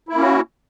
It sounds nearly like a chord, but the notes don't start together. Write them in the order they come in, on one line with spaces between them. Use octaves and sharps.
E4 A#3 C#4 F#4